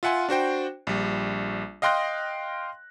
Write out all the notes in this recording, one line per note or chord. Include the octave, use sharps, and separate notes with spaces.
F4 E5 F#5 G#5 C6
D4 F#4 C5 G5
A#1 G3
D#5 F5 G5 C6 F#6 A#6